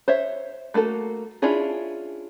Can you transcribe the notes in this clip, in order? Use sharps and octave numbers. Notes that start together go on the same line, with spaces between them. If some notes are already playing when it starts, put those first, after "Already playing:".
C5 C#5 E5
A3 A#3 F#4 A4
C#4 D4 E4 F4 G#4